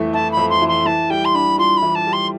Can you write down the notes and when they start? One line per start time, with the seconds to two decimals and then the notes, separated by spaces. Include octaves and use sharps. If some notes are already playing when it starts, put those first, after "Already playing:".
Already playing: F2 E3 A3
0.13 E4 A5
0.32 B5
0.37 F2
0.50 C6
0.62 E3
0.68 C6
0.85 E3 A5
1.10 G3 G5
1.25 C6
1.34 D4 B5
1.58 F4 C6
1.77 B5
1.82 E3
1.95 A5
2.07 G3
2.13 C6